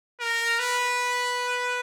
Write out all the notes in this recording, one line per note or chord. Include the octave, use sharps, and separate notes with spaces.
A#4
B4